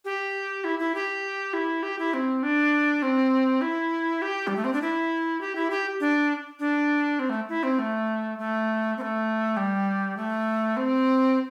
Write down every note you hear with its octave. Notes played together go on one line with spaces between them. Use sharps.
G4
E4
E4
G4
E4
G4
E4
C4
D4
C4
E4
G4
G3
A3
C4
D4
E4
G4
E4
G4
D4
D4
C4
A3
E4
C4
A3
A3
C4
A3
G3
A3
C4